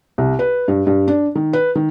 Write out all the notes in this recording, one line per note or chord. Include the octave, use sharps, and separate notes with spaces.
C2
B4
G2
G2
D4
D#3
B4
D#3